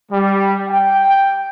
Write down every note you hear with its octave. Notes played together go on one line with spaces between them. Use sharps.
G3
G5